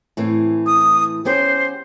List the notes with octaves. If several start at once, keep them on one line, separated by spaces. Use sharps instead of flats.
A2 E3 C4
D#6
B3 C#4 G4 C5